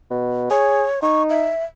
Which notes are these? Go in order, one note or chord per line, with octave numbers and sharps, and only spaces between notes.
B2
G#4 C#5
D#4 C#6
E5